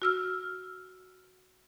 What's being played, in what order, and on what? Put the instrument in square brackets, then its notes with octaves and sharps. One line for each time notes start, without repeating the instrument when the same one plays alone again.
[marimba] F#4 E6 F6